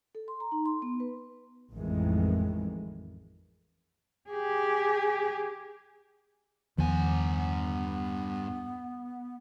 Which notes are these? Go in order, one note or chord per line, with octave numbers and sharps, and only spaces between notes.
A4
C6
A#5
D#4
C6
B3
B4
A1 F2 D#3 E3 G#3
G4 G#4
E2 G2 D#3 F3 B3 G#5